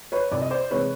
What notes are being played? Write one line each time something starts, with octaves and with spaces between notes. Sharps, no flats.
B4 C#5
C2 D5
D#5
C5 D5
C3 E3 G#3 B4 C#5